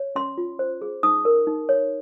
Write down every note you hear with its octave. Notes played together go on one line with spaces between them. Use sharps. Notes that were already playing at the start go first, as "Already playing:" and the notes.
Already playing: C#5
C#4 C6
F4
C5
G#4
D#4 D#6
A#4
D#4
C#5